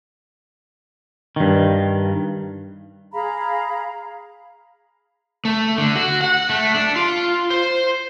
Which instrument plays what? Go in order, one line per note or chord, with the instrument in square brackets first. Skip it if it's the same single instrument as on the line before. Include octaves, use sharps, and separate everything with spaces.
[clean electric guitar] G2 D#3
[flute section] G#4 F5 A#5 B5
[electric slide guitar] A3
D3
F#4
F#5
A3
D4
F4
C5